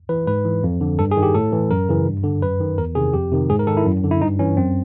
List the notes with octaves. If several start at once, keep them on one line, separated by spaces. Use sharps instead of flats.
E3 B4
G#2 B4
E3
F2
D3
G2 A4
G#4
D#3
G4
A2 A4
E3
F#2 A#4
C#3 E3
G2
D3
F#2 B4
D#3
E2 A#4
C3 D#3 G#4
F2 G4
C3 D#3
G#2 G#4
A#4
D#3 A4
E4
F#2
D3
E4
G2 D#4
E3 C#4
F#2 C4